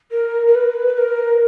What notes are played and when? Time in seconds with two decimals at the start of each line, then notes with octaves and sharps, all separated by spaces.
0.10 A#4
0.46 A#4
0.54 B4
0.86 B4
0.97 A#4